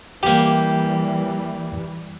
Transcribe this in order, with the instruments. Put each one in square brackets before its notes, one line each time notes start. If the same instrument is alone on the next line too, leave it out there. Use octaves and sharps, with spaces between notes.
[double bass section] E3 G3 [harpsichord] A#3 G4 [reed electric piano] G5